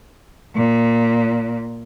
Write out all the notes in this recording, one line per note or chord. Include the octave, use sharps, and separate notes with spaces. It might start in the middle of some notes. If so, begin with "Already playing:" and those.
A#2